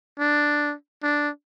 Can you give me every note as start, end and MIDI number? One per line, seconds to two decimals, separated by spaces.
0.19 0.75 62
1.03 1.30 62